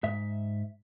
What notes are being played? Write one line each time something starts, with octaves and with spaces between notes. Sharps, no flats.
G#2 E5